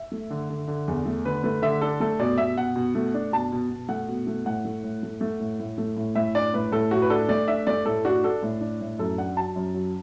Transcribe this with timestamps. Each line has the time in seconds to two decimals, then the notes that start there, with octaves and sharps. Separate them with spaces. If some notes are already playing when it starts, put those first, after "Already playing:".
Already playing: E5
0.12 A3
0.30 D3
0.50 D3
0.68 D3
0.88 E2
1.06 A3
1.25 D3 B4
1.44 A3 B4
1.62 D3 E5
1.82 D4 A4
2.00 A3 A4
2.19 B2 D5
2.38 B2 E5
2.57 B2 F#5
2.76 B2
2.95 A3
3.14 D4
3.32 B2 A5
3.52 B2
3.70 B2
3.89 A3 F#5
4.08 B2
4.27 A3
4.46 A2 F#5
4.65 A3
4.83 A2
5.03 A3
5.21 A3
5.40 A2
5.59 A2
5.78 A3
5.97 A2
6.15 A2 E5
6.35 D4 D5
6.54 A2 B4
6.72 A2 A4
6.91 A2 F#4
7.02 B4
7.10 D4 A4
7.29 A3 D5
7.48 D4 E5
7.67 A3 D5
7.85 A2 A4
8.05 D4 F#4
8.24 D4 A4
8.42 A2
8.61 D4
8.81 A2
8.99 F#2 A4
9.18 D4 F#5
9.37 F#3 A5
9.56 F#2
9.74 F#3